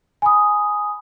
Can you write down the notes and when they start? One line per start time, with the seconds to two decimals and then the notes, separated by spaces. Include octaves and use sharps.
0.22 G#5 B5 D#6